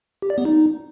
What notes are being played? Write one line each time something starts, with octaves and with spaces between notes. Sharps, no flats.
G4
D5
B3
D#4